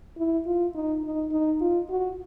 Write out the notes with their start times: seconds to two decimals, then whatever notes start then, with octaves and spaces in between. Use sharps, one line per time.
0.17 E4
0.46 F4
0.75 D#4
1.04 D#4
1.32 D#4
1.61 F4
1.90 F#4